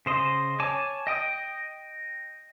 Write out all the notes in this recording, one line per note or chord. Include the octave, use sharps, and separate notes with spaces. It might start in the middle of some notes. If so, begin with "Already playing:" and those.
C#3 C5 D#5
C#5 G#5 A5 D6
D#5 G5 D#6